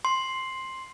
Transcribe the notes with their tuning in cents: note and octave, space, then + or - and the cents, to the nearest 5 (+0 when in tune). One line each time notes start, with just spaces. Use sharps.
C6 +5